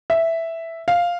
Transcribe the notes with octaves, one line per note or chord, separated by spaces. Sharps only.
E5
F5